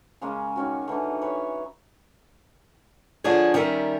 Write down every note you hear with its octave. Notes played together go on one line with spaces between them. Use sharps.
C#3 G#3 A#3 C#4
D#3 C#4 F#4
D3 E3 C#4 D#4
B4 C#5 G#5
D3 F3 D4 G#4 C#5
D#3 G3 C#4 A#4 E5